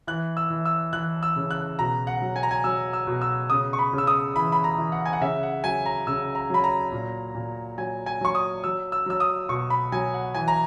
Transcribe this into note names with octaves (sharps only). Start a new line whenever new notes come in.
E3 F#6
E6
E3
E6
E3 F#6
E6
C#3
F#6
B2 A#5
F#5
F#3
G#5
A#5
G#5
F#3 E6
E6
B2
E6
C#3 D#6
C#6
B5
C#3
E6
D#6
E3 B5
B5
A#5
E3
F#5
G#5
F#5
C#3 E5
F#5
F#3 G#5
A#5
C#3 E6
A#5
F#3 B5
A#5
A#2
A#2
F#3 G#5
G#5
F#3 C#6
D#6
F#3 E6
E6
F#3 E6
D#6
B2 C#6
B5
F#3 G#5
F#5
E3 G#5
A#5